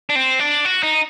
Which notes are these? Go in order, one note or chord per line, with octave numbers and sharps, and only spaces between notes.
D4
C4
D4
F#4
D#4